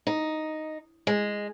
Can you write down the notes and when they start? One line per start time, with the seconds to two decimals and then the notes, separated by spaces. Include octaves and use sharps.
0.07 D#4
1.07 G#3